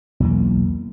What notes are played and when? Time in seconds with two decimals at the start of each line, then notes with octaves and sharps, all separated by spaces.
0.20 B1 E2 A#3